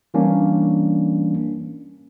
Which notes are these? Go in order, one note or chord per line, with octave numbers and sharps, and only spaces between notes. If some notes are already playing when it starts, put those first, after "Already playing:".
E3 G3 A#3 C#4 D4